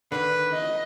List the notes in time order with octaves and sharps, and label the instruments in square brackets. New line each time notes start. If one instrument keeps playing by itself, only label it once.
[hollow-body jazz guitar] D3 D#3 [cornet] B4
[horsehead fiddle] D#5